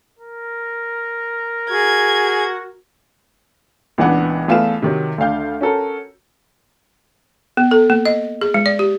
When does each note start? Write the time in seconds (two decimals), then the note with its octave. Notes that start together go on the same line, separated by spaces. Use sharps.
0.19 A#4
1.70 F#4 G#4 G#6
3.98 C#2 A#2 E3 B3 D4 F#5
4.48 E2 A3 F4 B4 E7
4.82 C3 D#3 F#3
5.18 D2 D4 F5 G6
5.61 C#4 F#4 A4 A#4
7.57 B3
7.71 A4
7.90 A#3
8.06 D#5
8.41 G#4
8.54 G#3
8.66 D5
8.79 G4